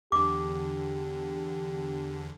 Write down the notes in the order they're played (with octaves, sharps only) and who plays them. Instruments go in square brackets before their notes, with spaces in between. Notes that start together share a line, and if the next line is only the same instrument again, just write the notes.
[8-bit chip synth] E2 D3 [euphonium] G4 [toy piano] D6